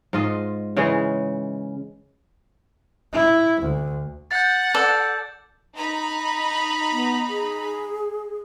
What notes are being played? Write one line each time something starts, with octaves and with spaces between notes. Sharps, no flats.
G#2 F4 D#5
C#3 E3 G#3 C#5
E4
D2
F#5 G6 A6
A4 D5
D#4 A#5 B5
B3
G#4